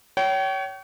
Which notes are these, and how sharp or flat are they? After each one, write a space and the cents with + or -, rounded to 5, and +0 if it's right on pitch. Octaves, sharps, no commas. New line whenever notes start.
C#5 +20 G5 -35